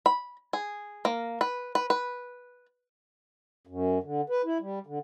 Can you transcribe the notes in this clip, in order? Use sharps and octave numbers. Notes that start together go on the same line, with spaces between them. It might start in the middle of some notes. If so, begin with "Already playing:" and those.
B5
G#4
A#3
B4
B4
B4
F#2
D3
B4
E4
G3
D3